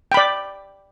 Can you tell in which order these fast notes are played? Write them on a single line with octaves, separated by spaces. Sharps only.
G5 B5 D5